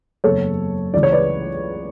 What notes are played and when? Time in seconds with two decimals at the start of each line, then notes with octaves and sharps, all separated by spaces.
0.24 F#1 E2 C#3 A4 C#5
0.94 C#2 C#3 E3 D5
1.03 C#5
1.12 B4 D5